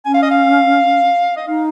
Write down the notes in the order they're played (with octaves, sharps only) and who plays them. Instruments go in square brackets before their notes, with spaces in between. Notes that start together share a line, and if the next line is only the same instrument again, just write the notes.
[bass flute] C#4 [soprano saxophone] G#5
[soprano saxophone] F5
D#5
F5
D#5
[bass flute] D#4 [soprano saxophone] F5